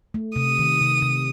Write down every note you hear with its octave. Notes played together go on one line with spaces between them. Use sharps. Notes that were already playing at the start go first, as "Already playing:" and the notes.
A3
C3 D#6
D#3
C3
C3